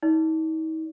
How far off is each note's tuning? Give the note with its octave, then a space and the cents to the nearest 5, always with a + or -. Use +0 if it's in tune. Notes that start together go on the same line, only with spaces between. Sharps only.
D#4 +45 D5 -40